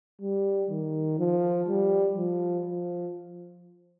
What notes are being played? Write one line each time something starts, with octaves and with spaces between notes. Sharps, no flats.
G3
D#3
F3
G3
F3
F3